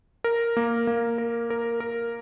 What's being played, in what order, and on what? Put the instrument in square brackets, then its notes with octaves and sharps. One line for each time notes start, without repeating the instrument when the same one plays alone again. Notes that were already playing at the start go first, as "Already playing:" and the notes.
[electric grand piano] A#4
A#3
A#3
A#4
A#4
A#4